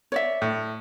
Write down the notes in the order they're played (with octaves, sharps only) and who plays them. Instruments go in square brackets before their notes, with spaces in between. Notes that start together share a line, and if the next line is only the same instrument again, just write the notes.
[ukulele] C#5 D5 E5
[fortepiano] A2